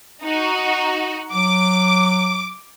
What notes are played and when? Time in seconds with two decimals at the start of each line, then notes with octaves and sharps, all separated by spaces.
0.22 D#4 F#4
1.33 F#3 D6